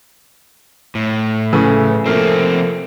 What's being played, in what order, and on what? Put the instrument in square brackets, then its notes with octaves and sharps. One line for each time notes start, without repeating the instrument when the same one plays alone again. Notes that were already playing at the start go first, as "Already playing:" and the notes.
[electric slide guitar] A2
[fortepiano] C#3 E3 A3
[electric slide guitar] C3 F3 C4 [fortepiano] A3 A#3